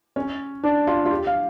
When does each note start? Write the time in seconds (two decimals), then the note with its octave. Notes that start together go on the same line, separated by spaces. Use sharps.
0.16 C#4
0.63 D4
0.87 F4
1.05 F4
1.11 G4
1.27 F5